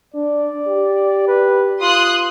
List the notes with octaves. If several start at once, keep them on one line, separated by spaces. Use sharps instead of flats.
D4 D5
G4
B4
F4 C6 D#6 F#6